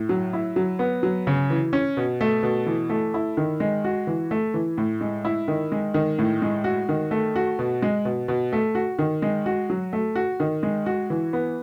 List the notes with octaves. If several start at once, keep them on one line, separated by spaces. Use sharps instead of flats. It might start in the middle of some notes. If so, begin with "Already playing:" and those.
Already playing: A2
F#3
E4
F#3
B3
F#3
C#3
E3
C#4
B2
A3
B2
E3
A3
E4
D#3
G#3
F#4
E3
A3
E3
A2
G#3
E4
D#3
G#3
D#3
A2
G#3
F#4
D#3
A3
F#4
B2
G#3
B2
B2
A3
F#4
D#3
G#3
F#4
F#3
A3
F#4
D#3
G#3
F#4
E3
B3